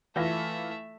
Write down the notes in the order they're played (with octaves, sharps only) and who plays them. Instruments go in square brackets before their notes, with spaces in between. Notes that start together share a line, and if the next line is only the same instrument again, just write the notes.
[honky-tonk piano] E3 F4 A#6 [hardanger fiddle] A3 E5